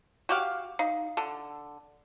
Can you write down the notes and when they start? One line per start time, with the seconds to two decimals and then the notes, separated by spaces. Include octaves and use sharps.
0.29 F#4 G4 F5
0.79 D#4 F5
1.17 D3 A4